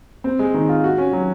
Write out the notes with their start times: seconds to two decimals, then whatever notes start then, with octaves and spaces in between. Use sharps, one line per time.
0.24 C4
0.39 G#3
0.54 D#3
0.69 F4
0.84 F#4
0.98 C#4
1.13 F#3